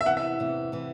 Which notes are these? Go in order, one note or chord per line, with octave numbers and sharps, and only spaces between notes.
E5
E2 C3 E3 F#5
E5
E2 C3 E3
C3 E3